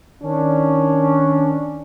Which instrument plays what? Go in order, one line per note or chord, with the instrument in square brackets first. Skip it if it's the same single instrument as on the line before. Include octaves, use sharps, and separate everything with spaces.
[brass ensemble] D#3 C#4 D4